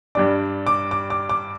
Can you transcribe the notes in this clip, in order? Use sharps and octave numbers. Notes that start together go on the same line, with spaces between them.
G2 G3 D4 D6
D6
D6
D6
D6